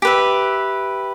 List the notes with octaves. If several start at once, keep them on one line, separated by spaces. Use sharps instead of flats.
G4 B4 E5